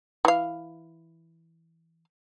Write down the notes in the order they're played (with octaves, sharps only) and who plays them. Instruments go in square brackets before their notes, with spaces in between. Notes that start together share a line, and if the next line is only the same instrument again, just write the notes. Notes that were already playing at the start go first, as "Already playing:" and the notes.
[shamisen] E3 F5